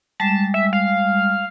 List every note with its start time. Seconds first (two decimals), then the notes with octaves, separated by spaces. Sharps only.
0.20 G3 G#3 A5
0.54 E5
0.73 F5